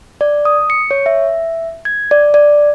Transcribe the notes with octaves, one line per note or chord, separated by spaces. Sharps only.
D5
D#6
C#7
C#5
E5
G#6
D5
D5